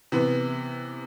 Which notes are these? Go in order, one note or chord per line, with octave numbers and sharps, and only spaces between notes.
C3 E3 B3